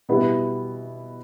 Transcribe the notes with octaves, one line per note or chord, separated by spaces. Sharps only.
B2 G3 B3 E4